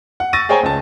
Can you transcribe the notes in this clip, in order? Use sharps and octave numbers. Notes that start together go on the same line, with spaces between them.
F#5
C#6 E6 A6 A#6 D#7
G#4 C5 C#5 G5 G#5 A#5
C#2 A5